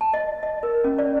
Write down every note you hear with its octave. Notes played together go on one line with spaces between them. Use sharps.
A5
D#5
D#5
A#4
C#4
D5